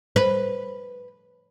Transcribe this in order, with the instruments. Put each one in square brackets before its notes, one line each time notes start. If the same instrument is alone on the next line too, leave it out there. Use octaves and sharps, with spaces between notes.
[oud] B4